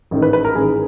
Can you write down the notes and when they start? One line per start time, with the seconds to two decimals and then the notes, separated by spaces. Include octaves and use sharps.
0.11 A1 G#2 D#3
0.22 B4
0.33 B4
0.45 A#4
0.55 A1 G#2 D#3 G#4